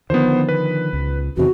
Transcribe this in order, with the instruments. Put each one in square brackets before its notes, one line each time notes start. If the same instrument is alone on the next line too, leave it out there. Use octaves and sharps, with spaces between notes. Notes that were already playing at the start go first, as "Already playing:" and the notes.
[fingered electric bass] D3 D#3 F3 [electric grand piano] B3 C5
[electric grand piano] B4
[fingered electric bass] C#2
[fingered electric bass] E2 C3 D#3 [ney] F#4